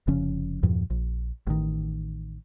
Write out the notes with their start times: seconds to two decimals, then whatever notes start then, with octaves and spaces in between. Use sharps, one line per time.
0.08 F1 C#3 F3 C#4
0.63 E2 G2 A#2 F3
0.90 A#1
1.47 A1 D#3